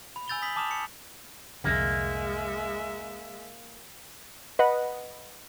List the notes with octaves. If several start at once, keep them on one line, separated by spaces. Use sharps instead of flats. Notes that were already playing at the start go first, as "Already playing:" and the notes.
B5
G#5 E6 G6 A6 F7 G7
D#6 B6 F#7
A5 D6 D#6 F6 E7 F7
C#7
C2 F2 D3 G#3 A#3 E5
B4 D#5 F#5 B5